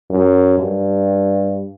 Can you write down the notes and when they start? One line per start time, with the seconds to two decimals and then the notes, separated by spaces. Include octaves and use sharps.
0.10 F#2
0.59 G2